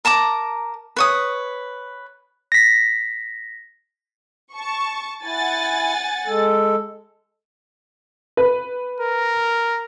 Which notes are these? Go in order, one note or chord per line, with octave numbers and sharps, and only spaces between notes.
A#4 A5 A#5 D6
B4 C#5 D#6
A#6 B6
A5 C#6
E4 F#5 G#5 A6
G#3 A4
B4
A#4